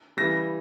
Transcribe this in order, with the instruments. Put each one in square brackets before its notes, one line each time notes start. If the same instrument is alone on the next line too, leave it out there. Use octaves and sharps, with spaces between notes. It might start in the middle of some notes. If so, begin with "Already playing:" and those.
[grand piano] C#3 E3 G3 A#6